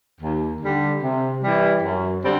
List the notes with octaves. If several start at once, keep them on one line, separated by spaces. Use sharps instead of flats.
D#2
D3 G3
C3
E3 G3
F#2
D3 G3 C4